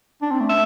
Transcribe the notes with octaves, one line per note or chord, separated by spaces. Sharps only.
D4
C4
A3
E5